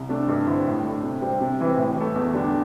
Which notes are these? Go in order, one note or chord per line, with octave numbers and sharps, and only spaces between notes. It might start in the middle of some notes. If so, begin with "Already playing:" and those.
Already playing: C2
C3 A3 D4
G2
D3 C4 E4
A2
A3 D4
C3
G3 C4
C3
E3 C4 E4
A2
E3 A3
E2
D3 G3 D4